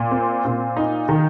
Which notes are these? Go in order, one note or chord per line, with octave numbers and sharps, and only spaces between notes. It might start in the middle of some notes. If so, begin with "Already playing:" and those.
Already playing: A#2
C4
A#2
D#4
D#3